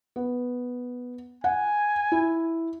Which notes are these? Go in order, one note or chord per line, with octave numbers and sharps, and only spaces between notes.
B3
F#5 G#5
E4